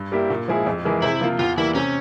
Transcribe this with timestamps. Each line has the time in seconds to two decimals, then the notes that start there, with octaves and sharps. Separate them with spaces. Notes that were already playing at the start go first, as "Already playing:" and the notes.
Already playing: G2
0.12 G3 A#3 E4 G4
0.30 A#2
0.48 F3 G#3 E4 G#4
0.66 F2
0.84 E3 G#3 E4 A#4
1.02 C3 E4
1.21 F3 A#3 F4
1.39 E2 F4
1.57 E3 G3 A#3 E4
1.75 C3 C#4